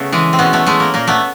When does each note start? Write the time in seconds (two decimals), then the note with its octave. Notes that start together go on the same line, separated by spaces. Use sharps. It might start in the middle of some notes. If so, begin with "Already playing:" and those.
Already playing: C#3 A3 B3
0.12 E3 G#3
0.33 C4
0.39 B2 B3 C#4
0.53 A3 B3
0.66 G#3 A3
0.80 A#3
0.94 A#2 A#3
1.07 A3 B3